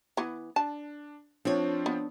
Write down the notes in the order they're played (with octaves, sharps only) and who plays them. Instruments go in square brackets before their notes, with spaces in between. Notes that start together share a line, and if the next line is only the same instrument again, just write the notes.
[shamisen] E3 B3
[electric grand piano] D4 [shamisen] A5
[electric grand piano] F3 C4 F4 [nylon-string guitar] D4 C#5
[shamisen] B3